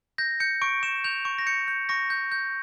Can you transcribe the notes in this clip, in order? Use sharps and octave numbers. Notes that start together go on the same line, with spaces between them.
G6 A#6
G6 C#7
C#6 D7
C#6 E7
G6 F7
C#6
A#6
G6 C#7
G6
C#6 A#6
G6
G6